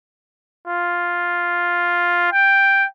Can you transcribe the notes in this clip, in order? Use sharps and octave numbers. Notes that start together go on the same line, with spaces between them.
F4
G5